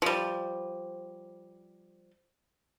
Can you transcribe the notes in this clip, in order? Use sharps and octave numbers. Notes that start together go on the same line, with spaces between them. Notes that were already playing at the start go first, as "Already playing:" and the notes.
F3 G3